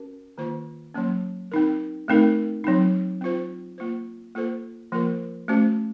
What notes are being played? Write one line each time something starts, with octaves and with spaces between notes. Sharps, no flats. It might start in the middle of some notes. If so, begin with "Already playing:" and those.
Already playing: C#4 F#4 A#4
D#3 A#3 F4 C5
F#3 A#3 C#4
C4 D#4 A#4
A3 C4 D#4 A#4
F#3 C4 D#4
C4 F4 C5
A#3 F4 C5
A#3 F4 A4 C5
F3 A#3 F4 A#4
A3 C#4 F#4 C5